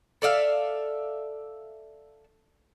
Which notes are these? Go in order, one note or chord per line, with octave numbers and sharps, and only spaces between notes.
A4 D5 E5 F5